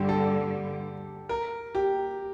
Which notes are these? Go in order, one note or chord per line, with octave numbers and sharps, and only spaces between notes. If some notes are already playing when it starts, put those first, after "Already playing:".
Already playing: G2 D3 G3 G4
A4
A#4
G4